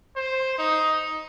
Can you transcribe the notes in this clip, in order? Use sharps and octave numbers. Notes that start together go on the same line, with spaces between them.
C5
D#4